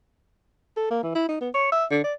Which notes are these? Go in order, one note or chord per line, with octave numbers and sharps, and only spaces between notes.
A4
A#3
E3
E4
D#4
B3
C#5
E5
D3
D5